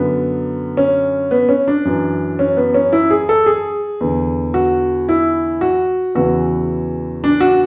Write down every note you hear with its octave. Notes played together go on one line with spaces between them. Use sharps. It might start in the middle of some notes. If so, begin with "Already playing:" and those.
Already playing: F#2 D3 B3
C#4
B3
C#4
D4
F#2 E3
C#4
B3
C#4
E4
G#4
A4
G#4
E2 D3
F#4
E4
F#4
E2 C#3 E3 F#4
D4
F#4